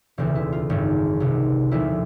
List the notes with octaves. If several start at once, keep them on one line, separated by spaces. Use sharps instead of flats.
E1 D2 C#3 E3 C4
E4
F4
G#1 F#2 D#3
C2 C3 D#3
E1 D2 C3 F3 E4